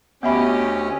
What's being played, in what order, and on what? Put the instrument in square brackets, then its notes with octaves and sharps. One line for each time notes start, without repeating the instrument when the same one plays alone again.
[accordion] D2 C#4 [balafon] B3 E5 B5 [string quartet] G4 D#5